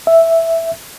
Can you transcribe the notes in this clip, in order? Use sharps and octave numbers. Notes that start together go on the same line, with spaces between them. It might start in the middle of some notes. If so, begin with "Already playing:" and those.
E5